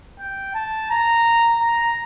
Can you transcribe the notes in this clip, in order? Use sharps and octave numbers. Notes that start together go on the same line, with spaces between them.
G5
A5
A#5
A#5